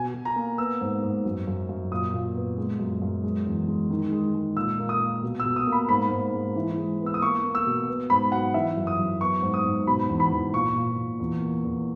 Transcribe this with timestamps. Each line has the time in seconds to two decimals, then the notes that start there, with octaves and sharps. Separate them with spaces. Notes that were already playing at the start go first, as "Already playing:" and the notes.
Already playing: B2 G#5
0.14 B2
0.25 A#5
0.36 A#3
0.58 B3 E6
0.81 G#2
1.02 G#2
1.25 F#2
1.47 F#2
1.69 F#2
1.91 A#2 D#6
2.13 A#2
2.35 B3
2.58 G#3
2.79 F#2
3.02 F#2
3.24 G#3
3.46 E2
3.68 G#3
3.90 D#3
4.12 G#3
4.35 G#3
4.56 A#2 E6
4.79 A#3
4.89 D#6
5.00 A#3
5.23 B2
5.40 E6
5.45 B2
5.56 D#6
5.67 A#3
5.72 B5
5.89 G#2 B5
6.11 G#2
6.34 G#3
6.56 E3
6.77 G#3
7.00 B3
7.06 E6
7.14 D#6
7.22 A#3 C#6
7.44 A#3
7.55 E6
7.66 B2
7.88 B3
8.10 G#2 B5
8.32 F#3 F#5
8.54 E3 E5
8.77 F#2
8.87 D#6
8.99 F#2
9.21 B3 C#6
9.42 G#2
9.54 D#6
9.65 G#2
9.87 B2 B5
10.09 E2
10.20 B5
10.32 E2
10.53 A#2 C#6
10.75 A#2
10.97 A#2
11.20 E2
11.41 A#3
11.64 E2